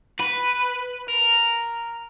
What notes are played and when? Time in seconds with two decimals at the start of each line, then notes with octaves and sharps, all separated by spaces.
0.20 B4
1.08 A#4